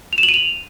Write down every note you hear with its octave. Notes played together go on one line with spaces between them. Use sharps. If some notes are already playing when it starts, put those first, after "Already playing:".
F7
E7
F#7
D#7
F7